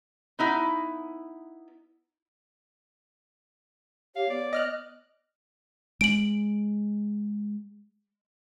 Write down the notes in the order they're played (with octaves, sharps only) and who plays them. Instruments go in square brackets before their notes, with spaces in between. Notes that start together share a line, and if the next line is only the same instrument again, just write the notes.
[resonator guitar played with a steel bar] B3 D#4 E4
[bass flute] G4 [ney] C#5 [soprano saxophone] F5
[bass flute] B3 [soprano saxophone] D5
[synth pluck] D#5 F6 F#6
[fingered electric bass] G#3 [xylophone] D7 F#7